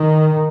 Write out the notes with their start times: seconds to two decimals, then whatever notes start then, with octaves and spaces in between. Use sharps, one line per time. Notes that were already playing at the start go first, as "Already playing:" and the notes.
Already playing: D#3